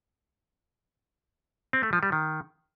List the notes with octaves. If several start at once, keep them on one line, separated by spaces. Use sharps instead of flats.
C4
A3
F3
G3
D#3